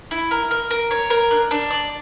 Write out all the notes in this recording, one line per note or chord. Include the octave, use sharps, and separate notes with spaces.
E4
A#4
A#4
A#4
C#5
A#4
D4
D4
D5